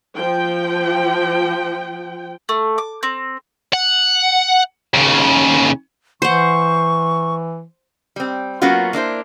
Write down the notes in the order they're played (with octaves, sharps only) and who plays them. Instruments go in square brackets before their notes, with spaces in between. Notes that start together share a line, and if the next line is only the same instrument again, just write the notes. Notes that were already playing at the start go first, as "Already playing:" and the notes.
[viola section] F3 G5
[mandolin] A3
D6
C4
[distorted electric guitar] F#5
D#2 C#3
[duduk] E3 [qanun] C5 F#5 [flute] C#6
[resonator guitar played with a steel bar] G3 C4
F#3 A#3 B3 C#4 F4 F#4
A#3 D4 E4 C5